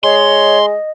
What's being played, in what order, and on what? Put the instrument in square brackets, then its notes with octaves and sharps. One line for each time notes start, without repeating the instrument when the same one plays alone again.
[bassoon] G#3 [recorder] C#5 [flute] D#5 [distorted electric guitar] C6